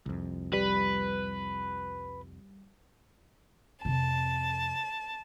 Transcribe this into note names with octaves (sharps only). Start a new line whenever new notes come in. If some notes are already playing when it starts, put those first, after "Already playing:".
C2 F2
G3 B4
F2 C3 A5